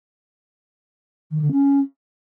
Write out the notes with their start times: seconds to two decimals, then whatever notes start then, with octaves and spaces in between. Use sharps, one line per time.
1.31 D#3
1.41 D3
1.52 C#4